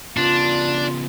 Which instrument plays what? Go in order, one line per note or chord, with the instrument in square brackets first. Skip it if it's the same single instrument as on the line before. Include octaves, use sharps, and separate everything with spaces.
[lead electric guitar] C#3 B3 [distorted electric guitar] D4 [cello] F4